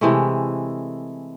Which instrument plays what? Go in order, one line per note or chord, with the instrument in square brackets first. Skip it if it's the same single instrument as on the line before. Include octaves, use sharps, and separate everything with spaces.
[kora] C3 E3 G#3 A3